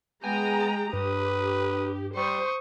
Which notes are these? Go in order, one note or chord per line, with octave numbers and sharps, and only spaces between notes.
G#3 B3 G5 G#5 A#5
G2 G4 B4 D#6
G3 C5 C#6 D#6